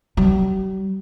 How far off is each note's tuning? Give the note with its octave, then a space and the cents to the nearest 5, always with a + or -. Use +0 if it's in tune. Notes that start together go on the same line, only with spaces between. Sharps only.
G3 -45